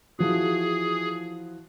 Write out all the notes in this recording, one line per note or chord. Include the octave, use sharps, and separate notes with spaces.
E3 F3 F#4 G#4